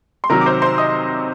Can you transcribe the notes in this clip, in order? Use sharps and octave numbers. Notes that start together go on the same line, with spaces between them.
C6
C3 D#3 F#3 A#4 A#5
D6
C5 C6
C5 C6
D#5 D#6